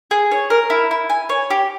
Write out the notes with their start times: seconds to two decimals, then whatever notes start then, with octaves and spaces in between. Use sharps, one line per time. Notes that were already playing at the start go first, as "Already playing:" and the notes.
0.11 G#4
0.31 C#5
0.50 A#4
0.70 E4
0.91 E4
1.10 G#5
1.29 C#5
1.50 G4